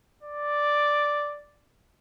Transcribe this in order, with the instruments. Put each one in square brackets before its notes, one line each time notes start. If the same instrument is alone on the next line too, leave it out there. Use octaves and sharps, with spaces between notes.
[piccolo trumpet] D5